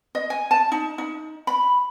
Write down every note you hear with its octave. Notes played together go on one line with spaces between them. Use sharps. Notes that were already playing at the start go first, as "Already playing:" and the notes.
D#5
G#5
A5
D#4
D#4
B5